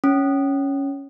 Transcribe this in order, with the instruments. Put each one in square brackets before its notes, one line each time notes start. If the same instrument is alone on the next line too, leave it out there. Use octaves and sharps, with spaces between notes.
[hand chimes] C#4